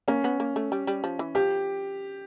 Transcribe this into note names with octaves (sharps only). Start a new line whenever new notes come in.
A#3 C#4
B3
A#3
A3
G3
G3
F3
E3
F3 G4